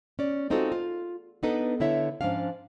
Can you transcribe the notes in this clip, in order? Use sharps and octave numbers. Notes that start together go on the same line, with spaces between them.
C#4 D5
G#3 C4 D#4 F4 F#4 A4
F4
B3 D4 D#4 A4 B4
D3 E4 C#5 E5
G#2 F3 C#4 D4 F5